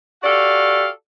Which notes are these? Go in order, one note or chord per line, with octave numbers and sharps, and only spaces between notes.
F#4 G4 A4 D5 F5